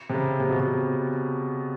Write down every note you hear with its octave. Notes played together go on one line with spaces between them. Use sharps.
C3
C#3
C3
B2
C3